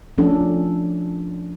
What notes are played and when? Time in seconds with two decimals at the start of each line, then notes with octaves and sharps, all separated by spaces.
0.18 F3 A3 C#4 D4 E4 A4